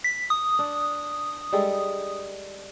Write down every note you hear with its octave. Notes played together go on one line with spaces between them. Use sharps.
B6
D#6
D4
G3 G#3 A4